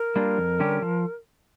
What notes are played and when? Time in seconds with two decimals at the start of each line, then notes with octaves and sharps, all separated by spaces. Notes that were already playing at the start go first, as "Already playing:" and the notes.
Already playing: A#4
0.16 G3 A#3 D4 F4
0.38 F2
0.60 D3 G3 C#4 G4
0.82 F3